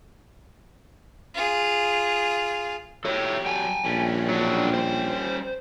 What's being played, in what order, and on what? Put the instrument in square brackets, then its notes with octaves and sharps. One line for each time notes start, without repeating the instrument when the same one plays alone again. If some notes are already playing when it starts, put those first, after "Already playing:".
[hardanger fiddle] F4 G#4
[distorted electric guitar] F#3 G4 [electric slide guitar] A4 C#5
[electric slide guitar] G5 G#5
[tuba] A#1 [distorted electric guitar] G3 C#4
[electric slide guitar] F#3 D4
C5